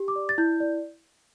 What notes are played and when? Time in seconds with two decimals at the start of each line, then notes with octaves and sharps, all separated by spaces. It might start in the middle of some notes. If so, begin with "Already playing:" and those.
Already playing: G4
0.08 D6
0.16 D5
0.29 A6
0.38 E4 G6
0.60 D5